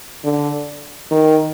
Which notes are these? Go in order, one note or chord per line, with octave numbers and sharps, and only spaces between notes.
D3
D#3